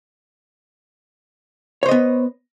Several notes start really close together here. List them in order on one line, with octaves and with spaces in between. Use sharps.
C#5 C5 D#5 B3